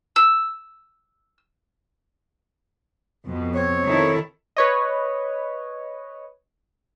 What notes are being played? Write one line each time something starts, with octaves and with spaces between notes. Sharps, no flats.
E6
F2 B2
C4 C#5
D#3 E4 A4
B4 C#5 D#5